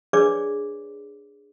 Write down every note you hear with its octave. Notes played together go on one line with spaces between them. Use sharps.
D4 G#4 B4 C#5 D5 D6